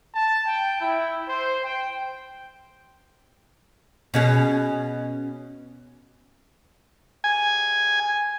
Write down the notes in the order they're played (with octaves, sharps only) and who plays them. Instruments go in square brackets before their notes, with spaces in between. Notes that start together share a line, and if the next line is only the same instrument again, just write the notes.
[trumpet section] A5
G5
E4
C5
G5
[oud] B2 C#4 G#4
[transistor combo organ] G#5